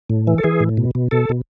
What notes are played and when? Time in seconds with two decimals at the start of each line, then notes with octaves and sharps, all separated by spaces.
0.10 A2
0.27 E3
0.38 A4
0.44 E3 G#4
0.60 A2
0.77 B2
0.95 B2
1.11 B2 A4
1.29 B2